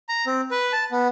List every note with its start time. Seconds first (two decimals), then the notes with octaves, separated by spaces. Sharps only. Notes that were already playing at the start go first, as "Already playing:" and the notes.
0.09 A#5
0.26 C4
0.51 B4
0.73 A5
0.92 B3